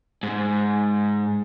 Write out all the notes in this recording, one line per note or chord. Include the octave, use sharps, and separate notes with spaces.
G#2